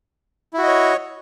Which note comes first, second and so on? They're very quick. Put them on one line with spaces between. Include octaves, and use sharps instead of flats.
E4 F#4 D#5 C#5